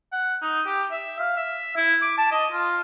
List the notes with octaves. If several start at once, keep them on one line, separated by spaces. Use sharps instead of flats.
F#5
D#4
G4
E5
F5
E5
E4
D6
A5
D#5
F4